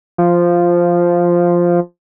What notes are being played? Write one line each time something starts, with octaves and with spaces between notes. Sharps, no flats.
F3